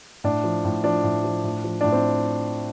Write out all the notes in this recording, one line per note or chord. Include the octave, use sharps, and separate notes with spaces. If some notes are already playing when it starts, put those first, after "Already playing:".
A2 D4
F3
A2
F3 D4
A2
F3
A2
F3
A2 D4
C4